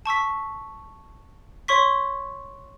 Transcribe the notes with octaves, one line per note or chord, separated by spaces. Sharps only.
A5 C#6 E6 B6
C#5 C6 C#6 B6